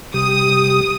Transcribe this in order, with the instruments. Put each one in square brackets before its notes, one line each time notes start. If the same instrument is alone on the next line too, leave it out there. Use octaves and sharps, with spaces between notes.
[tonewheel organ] C3 G3 G4 [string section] D#6